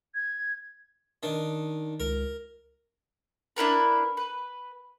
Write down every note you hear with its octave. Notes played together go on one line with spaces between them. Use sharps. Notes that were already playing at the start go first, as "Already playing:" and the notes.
G#6
D#3 D4
C#2 A#4
D4 E4 A#4 B4
B4